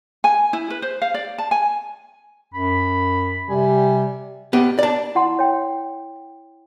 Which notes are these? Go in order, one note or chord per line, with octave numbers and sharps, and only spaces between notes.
G#5
E4
B4
C5
F5
D5
A5
G#5
F#2 B5
C3 G3 G#5
B3 G4
D5 A5
E4 F#5 C6
C#5 G5